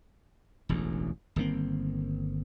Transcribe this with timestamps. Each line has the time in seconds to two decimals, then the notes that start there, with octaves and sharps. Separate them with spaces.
0.69 E1 A1 D2
1.36 G1 D#3 A#3 C4